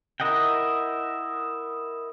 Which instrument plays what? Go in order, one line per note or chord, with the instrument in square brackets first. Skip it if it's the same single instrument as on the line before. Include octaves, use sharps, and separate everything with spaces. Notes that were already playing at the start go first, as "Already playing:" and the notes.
[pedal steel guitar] E4 A#4 D#5 F#5 G5